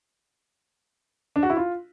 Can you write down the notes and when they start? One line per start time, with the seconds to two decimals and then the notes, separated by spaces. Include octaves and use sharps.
1.36 D4
1.43 F#4
1.50 E4
1.57 F4